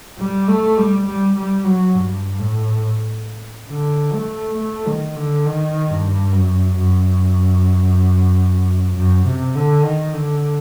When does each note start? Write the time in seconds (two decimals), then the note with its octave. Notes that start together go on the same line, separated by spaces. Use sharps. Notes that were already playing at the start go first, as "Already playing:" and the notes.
0.18 G3
0.48 A3
0.78 G3
1.06 G3
1.36 G3
1.65 F#3
1.94 G2
2.39 A2
3.70 D3
4.14 A3
4.57 A3
4.87 D#3
5.16 D3
5.45 D#3
5.89 G2
6.33 F#2
6.77 F#2
8.96 F#2
9.26 C3
9.55 D3
9.84 D#3
10.14 D3